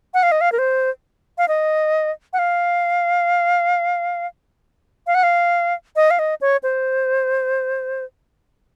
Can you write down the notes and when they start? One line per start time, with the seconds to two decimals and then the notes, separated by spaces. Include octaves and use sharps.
0.14 F#5
0.23 F5
0.32 D#5
0.41 F5
0.52 A#4
0.59 C5
1.38 F5
1.48 D#5
2.33 F#5
2.39 F5
5.07 F5
5.15 F#5
5.23 F5
5.96 D#5
6.11 F5
6.19 D#5
6.41 C#5
6.63 C5